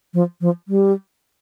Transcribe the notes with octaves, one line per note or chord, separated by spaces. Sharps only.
F3
F3
G3